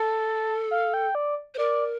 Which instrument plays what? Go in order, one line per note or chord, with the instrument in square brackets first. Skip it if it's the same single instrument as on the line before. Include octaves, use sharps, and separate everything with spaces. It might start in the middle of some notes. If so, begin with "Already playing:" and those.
Already playing: [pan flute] A4 [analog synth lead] A5
[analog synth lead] F5
G5
D5
[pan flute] C5
[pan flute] A#4 [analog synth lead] D5